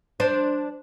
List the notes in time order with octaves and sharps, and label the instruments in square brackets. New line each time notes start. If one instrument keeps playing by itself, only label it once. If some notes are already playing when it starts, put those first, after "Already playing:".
[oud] D4 C5